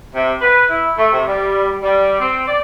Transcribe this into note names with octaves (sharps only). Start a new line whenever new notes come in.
C3
B4
E4
A3
C3
G3
G3
C4
D5